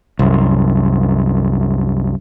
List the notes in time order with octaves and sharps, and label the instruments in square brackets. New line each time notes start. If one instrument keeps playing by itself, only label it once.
[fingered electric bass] C2 F#2